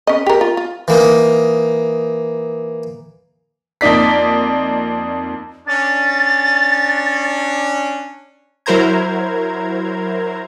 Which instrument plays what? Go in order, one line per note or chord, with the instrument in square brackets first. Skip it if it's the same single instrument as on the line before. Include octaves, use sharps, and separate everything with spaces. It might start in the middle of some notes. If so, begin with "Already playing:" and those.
[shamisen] C#4 D#5
G4 A#4
F4
F4
[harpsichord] E3 A#3 D#4
[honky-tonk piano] F2 A#3 D#4 D5 B6
[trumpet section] C#4 D4 [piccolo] A6
[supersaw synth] F#3 E4 A#4 C5 A#5 G#6